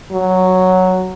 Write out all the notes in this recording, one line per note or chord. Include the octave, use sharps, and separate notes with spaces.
F#3